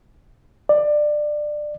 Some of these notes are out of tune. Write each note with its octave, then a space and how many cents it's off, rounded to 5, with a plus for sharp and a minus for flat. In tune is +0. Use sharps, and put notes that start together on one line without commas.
D5 +20